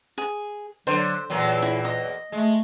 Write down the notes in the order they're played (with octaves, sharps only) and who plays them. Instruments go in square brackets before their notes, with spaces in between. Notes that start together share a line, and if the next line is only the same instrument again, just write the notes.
[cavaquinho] G#4
[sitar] D3 [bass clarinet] F#3 [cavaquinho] C5
[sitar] E2 F#3 A#3 [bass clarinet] A#2
[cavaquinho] E4
D#5
[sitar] G#3 [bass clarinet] A3